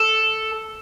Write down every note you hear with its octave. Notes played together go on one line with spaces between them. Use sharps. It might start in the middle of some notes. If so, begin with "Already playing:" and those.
Already playing: A4